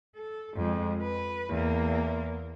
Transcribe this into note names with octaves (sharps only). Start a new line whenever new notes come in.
A4
F2 G#3
B4
E2 A#3